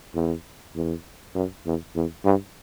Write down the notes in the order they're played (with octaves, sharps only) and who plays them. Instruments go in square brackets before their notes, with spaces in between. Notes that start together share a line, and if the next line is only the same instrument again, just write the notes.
[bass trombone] E2
E2
F#2
E2
E2
G2